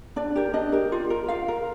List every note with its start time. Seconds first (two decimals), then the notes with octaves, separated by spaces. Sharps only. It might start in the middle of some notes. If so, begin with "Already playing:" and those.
0.16 D4 D5
0.35 G4 A#4
0.54 D4 D#5
0.72 G4 A#4
0.92 F4
1.10 A#4
1.28 F4 F5
1.48 A#4